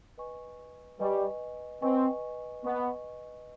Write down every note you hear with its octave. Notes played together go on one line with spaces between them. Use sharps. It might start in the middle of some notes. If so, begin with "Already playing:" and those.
B4 D#5 G#5 C#6
G3 B4 D#5 G#5 C#6
C4 B4 D#5 G#5 C#6
B3 B4 D#5 G#5 C#6